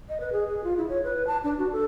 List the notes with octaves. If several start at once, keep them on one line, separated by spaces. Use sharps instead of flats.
D#5
B4
G#4
G#4
F4
E4
C#5
B4
A5
D4
F#4
A4